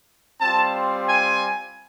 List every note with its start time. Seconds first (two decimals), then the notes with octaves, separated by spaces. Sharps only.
0.41 G3 C4 F4 A5
1.08 G#5